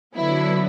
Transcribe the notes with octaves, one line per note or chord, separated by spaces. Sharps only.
D3 F#3 B3 E4